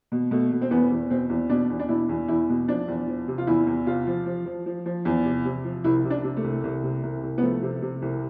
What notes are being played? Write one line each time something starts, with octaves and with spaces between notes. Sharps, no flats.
B2
B2 A3
B2
C4
E2 B3
E2
B2 C4
E2
B2 D4
E2
D4
B2 E4
E2
E2 E4
B2
F3 D4
E2
F3
C3
F4
E2 E4
E2
C3 F4
F3
F3
F3
F3
F3
E2
C3
C3
F3
C2 E4
C3
D4
C3
A3
C2
C2
C3
C2
C2
B3
F3 A3
C3
C3
C2